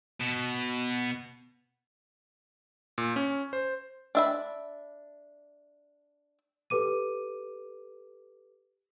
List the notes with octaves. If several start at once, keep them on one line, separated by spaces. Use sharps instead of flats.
B2
A#2
C#4
C5
D4 E5 B5
G4 A4 B4 D6 D#7